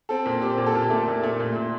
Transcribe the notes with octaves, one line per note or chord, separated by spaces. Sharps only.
C4 A4
A#2
C4 G4
A#2
A4
A#2 G4
A3
A#2
A3
A#2
A#2